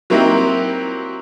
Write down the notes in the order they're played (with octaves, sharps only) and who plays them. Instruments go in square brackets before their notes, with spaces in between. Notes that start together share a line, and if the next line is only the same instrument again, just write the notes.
[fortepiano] F#3 A#3 C4 D#4 E4 G4